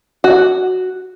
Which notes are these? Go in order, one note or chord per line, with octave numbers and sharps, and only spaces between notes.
F#4